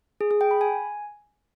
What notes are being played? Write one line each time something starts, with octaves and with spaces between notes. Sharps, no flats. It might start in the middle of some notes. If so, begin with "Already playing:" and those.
G#4
G#4
G5
B5
G#5